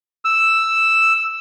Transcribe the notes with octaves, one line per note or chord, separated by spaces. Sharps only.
E6